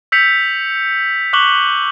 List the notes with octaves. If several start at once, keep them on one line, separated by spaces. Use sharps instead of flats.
E6 G6 B6 C#7 F7
C#6 D6 F#6 F#7 G7